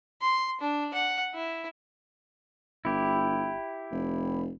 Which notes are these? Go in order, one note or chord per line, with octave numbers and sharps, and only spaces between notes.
C6
D4
F#5
E4
G1 E4 G4
F1